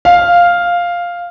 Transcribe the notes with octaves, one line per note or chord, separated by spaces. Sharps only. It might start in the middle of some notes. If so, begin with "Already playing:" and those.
F5